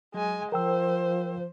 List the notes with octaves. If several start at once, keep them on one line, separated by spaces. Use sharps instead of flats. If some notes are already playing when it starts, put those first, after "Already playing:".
F#3 G#3 G#5
F3 A#4 C5 G5 E6